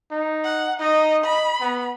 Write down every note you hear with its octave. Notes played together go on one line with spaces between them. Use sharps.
D#4
F#5
D#4 D#5
D#5 B5
B3